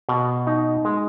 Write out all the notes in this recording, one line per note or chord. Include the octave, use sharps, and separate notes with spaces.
B2
D#4
G#3